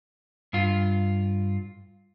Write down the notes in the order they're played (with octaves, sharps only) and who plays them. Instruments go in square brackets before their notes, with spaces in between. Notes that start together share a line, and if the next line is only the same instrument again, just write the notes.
[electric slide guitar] G2 F4